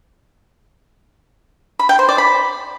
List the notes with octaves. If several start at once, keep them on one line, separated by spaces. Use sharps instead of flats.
B5
G5
C5
D5
B5